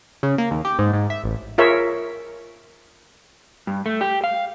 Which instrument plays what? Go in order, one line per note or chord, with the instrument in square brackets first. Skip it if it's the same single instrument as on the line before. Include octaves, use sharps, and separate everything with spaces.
[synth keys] C#3
A#3
D#2
G4
G#2
G#2
E5
A1
[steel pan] F4 G#4 A#4 C#5 E5
[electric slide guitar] G2
A3
G4
F5